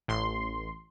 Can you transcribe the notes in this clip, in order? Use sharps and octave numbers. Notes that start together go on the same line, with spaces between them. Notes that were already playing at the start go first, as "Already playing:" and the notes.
A1 C6